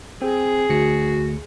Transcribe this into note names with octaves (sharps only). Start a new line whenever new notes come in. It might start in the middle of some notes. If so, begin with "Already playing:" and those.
C4 G#4
D2 F#4 C#7